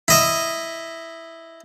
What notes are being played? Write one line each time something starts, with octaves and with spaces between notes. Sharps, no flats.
E4 D#5 E5